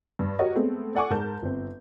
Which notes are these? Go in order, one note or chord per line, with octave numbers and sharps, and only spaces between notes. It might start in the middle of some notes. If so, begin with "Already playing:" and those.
G2
F#4 G4 A#4 C#5 D#5
G#3 A3 B3 C4 A4
A4 D5 F#5 G#5 C#6 D6
G#2 A#4 A5 G6
G1 C4